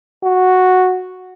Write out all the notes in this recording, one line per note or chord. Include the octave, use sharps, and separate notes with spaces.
F#4